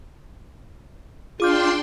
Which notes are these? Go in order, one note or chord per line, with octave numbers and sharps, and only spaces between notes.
D4 F4 G#4 G5 C6 D6 G6